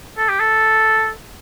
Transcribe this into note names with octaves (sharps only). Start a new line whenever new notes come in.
A4
G4
A4